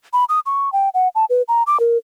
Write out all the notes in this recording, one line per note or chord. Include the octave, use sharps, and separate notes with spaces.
B5
D#6
C#6
G5
F#5
A5
B4
A#5
D6
A#4